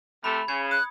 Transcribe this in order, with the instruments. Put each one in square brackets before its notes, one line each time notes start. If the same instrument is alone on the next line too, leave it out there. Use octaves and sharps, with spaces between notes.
[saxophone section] C3 A3 [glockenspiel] B5
[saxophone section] C#3 [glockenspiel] G#6 C#7
[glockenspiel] D#6 [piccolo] F#6